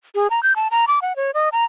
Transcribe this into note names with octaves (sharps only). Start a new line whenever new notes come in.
G#4
A#5
G6
A5
A#5
D6
F#5
C#5
D#5
A#5